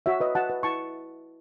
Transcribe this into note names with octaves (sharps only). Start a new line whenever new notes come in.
F#4 C#5 E5
B4 D#5
F#4 F#5 A5
B4
E4 A5 C#6